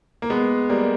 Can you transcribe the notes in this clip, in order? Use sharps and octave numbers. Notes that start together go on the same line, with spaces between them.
A#3
G#3 B3
G3 A#3